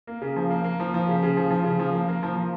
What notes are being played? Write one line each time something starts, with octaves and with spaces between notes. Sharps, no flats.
A#3
C#3
F3
A#3
A#3
F3
F3
C#3
C#3
F3
F3
C#3
F3
A#3
A#3
F3
F3